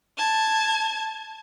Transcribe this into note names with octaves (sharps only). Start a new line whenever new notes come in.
A5 G#6